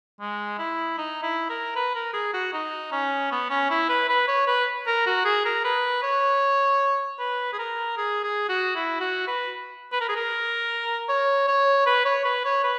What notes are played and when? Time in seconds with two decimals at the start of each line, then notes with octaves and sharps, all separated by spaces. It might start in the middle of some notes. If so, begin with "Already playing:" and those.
0.20 G#3
0.59 E4
0.98 D#4
1.23 E4
1.50 A#4
1.76 B4
1.95 A#4
2.14 G#4
2.34 F#4
2.53 D#4
2.92 C#4
3.31 B3
3.50 C#4
3.70 E4
3.89 B4
4.09 B4
4.27 C#5
4.47 B4
4.86 A#4
5.06 F#4
5.25 G#4
5.45 A#4
5.64 B4
6.02 C#5
7.19 B4
7.53 G#4
7.59 A#4
7.97 G#4
8.24 G#4
8.49 F#4
8.76 E4
9.01 F#4
9.27 B4
9.92 B4
10.01 A#4
10.09 G#4
10.16 A#4
11.09 C#5
11.48 C#5
11.86 B4
12.05 C#5
12.25 B4
12.45 C#5
12.63 B4